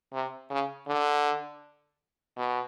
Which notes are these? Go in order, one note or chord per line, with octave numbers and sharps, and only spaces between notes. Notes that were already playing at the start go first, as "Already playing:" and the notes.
C3
C#3
D3
B2